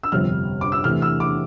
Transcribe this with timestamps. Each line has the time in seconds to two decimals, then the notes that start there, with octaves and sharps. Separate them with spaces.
0.03 E6
0.12 G1 F2 C3 F6
0.61 D6
0.72 E6
0.84 E2 C3 E3 A3 F6
1.02 E6
1.20 D6